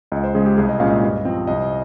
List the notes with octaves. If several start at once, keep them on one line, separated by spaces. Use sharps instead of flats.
C#2 D#5
C5
C#3 G#3 G#4
G4
C2 G#4
D#5
A#2 G#3 C#4 F5
D#5
G2
F3 C4
C2 D#5